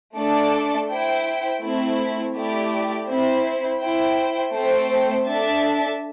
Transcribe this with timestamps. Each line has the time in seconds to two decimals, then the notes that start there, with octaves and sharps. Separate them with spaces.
0.15 A3 D4 A4 D5 A5
0.89 E4 C5 G5
1.61 A3 C4 E4
2.34 A3 E4 G4 D5
3.07 C4 E4 C5
3.80 E4 C5 G5
4.53 A3 C4 A4 C5 G5
5.27 D4 A4 E5 A5